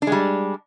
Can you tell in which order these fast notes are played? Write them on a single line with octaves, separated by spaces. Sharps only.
D4 G#3 G3